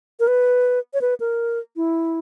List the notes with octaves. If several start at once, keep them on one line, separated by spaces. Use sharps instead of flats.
A#4
B4
C#5
B4
A#4
E4